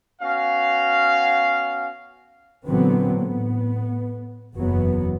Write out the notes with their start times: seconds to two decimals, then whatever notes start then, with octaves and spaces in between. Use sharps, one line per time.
0.22 B3 C#4 F#4 F5
2.67 A#2 D3 E3 F#3 B3 C4
3.23 A2 B3
4.54 F#1 E2 F#3 B3